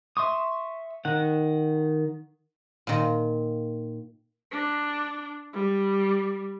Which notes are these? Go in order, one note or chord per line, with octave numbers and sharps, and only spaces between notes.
E5 C6 C#6 D#6
D#3 F#5
A#2 D#3
D4
G3